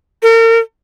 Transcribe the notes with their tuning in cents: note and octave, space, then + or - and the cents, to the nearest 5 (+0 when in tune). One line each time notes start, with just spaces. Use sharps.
A#4 -40